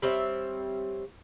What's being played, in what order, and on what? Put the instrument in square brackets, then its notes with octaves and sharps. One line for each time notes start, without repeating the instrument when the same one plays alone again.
[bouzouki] G3 C4 C#5 E5